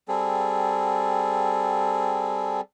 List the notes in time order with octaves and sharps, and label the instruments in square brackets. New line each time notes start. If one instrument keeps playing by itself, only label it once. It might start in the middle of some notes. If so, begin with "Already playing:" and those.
[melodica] G3 C4 G#4 A4